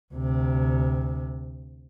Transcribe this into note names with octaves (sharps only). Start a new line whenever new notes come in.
D2 C3